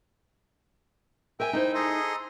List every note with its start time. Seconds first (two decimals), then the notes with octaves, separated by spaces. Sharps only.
1.40 A#4 E5 G5 G#5
1.53 D#4 E4 C5
1.75 G#4 A4 D#5 A#5 C6